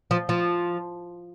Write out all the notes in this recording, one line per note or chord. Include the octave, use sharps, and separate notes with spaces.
F3
F3